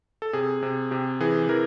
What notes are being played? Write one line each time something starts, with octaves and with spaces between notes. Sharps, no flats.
A4
C3 G#4
C3
C3 G4
E3 G#4
E3 A#4